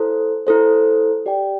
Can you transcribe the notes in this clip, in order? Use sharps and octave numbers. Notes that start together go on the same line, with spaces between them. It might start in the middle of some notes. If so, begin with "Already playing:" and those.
Already playing: E4 A4 C5
E4 A4 C5
G4 D5 G5